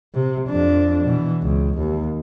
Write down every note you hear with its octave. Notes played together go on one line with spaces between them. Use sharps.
C3
F2 D4
B2 E3
C#2
D#2